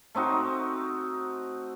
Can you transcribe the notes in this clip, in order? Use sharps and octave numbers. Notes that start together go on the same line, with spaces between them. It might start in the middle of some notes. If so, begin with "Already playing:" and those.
A3 C4 D#4 F#4